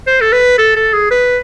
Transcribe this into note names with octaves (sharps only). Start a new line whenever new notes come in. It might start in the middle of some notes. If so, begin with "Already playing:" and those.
C5
A4
B4
A4
A4
G#4
B4